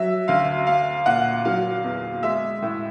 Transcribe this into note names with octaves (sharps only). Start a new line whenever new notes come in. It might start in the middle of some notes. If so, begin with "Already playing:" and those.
Already playing: F#3 E5
D2 F5
A3 F5
A#2 F#5
F#3 F5
E2
G#3 E5
A2